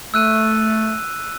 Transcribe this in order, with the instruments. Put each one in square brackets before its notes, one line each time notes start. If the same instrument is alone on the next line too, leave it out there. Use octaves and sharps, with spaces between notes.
[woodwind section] A3 [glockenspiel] E6 F#6 D#7